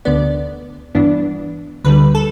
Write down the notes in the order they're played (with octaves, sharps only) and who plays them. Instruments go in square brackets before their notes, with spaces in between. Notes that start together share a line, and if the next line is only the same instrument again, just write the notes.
[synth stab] D2 D3 B3 D5
G1 G2 E3 B3 D4
D2 D3 G3 B4
A4